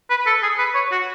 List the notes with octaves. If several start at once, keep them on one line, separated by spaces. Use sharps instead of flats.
B4
A4
G#4
B4
C#5
F#4